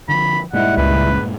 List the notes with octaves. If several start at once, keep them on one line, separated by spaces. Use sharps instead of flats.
D3 D#3 F3 B5
G2 A#2 G3 G#3 D#4 E4 F#5
C#2 B4